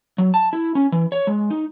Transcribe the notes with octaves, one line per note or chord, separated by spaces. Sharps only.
F#3
A5
E4
C#4
E3
C#5
G#3
D#4